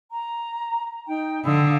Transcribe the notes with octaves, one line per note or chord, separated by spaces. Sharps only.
A#5
D#4 G5
D3 F5 D#6 E6